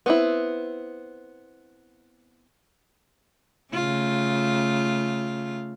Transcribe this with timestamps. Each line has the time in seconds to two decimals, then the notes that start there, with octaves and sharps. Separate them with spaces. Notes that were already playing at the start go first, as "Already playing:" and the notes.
0.06 B3 C4 E4
3.74 C#3 A3 F4